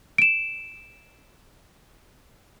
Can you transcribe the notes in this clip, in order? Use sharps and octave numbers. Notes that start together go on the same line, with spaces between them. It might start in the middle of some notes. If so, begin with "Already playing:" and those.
D7 E7